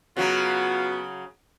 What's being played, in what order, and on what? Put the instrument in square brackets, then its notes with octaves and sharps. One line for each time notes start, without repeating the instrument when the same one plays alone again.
[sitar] C#3 F#3 [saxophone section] B3 F4 F#4